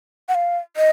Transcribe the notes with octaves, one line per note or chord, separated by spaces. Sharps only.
F#5
F5
D#5